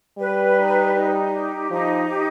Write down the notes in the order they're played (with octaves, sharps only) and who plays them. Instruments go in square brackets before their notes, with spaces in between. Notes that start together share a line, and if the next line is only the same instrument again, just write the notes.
[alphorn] G3 [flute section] B4
[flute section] D#4
D#4
G4
[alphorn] F3 [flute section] D#4
[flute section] G4